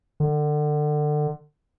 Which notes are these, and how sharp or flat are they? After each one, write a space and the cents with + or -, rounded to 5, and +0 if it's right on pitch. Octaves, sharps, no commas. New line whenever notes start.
D3 +30